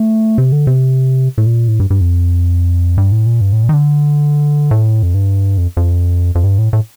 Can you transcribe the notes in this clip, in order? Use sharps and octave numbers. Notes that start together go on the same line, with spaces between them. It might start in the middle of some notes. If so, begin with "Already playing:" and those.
Already playing: A3
C3
D3
C3
A2
A#2
A2
G2
G2
F2
G2
A2
A#2
G2
A2
A#2
D#3
D3
A2
F2
G2
F2
F2
F2
G2
A2
A2